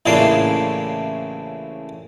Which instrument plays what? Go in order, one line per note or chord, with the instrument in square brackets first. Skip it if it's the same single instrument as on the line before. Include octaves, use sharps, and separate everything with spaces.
[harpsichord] A1 A2 C#3 A#3 D4 C6